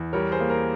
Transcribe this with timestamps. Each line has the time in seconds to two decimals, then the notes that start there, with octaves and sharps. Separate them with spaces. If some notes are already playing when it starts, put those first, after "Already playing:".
Already playing: E2
0.13 G3 A#4 C#5
0.31 G#4 C5
0.40 A#3
0.50 A#4